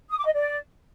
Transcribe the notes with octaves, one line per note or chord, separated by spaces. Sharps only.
D#6
D6
D#5
D5